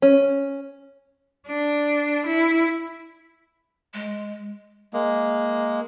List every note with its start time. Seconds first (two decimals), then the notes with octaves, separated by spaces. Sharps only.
0.02 C#4
1.47 D4
2.25 E4
3.94 G#3
4.93 G#3 A#3